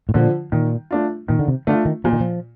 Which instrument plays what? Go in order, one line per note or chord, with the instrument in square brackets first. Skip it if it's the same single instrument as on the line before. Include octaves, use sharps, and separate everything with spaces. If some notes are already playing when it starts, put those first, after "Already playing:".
[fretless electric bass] A2
[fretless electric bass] A#2 [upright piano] D3 F3
[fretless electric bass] A#2 [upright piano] D#3
[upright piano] A3 D4 F4
[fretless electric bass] A#2 [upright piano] D#3
[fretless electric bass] D3
C3
[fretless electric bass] D3 [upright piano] A3 D4 F4
[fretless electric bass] D#3
[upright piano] A#2 [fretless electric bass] F3
[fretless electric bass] D#3
F3